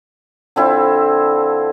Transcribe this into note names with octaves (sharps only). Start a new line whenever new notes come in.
D3 F3 C4 E4